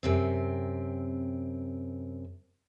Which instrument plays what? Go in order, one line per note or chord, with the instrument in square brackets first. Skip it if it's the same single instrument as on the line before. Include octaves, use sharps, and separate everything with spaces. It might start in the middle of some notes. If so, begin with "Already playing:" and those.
[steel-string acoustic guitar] F#2 C3 C4